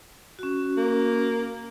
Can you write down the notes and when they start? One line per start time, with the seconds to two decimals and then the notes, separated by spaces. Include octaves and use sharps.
0.39 C#4 F#4
0.77 A#3